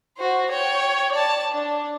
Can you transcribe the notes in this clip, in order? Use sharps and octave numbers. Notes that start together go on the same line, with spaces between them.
F#4 C5
C#5 G5
D5 A5
D4